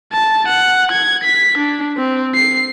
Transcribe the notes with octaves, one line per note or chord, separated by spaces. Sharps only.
A5
F#5
G#6
B6
D4
C4
C7